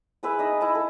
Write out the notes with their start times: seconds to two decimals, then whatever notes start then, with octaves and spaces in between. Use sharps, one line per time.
0.23 E4 G#4 B4 E5
0.39 D#4 D#5
0.61 E4 A5
0.75 A4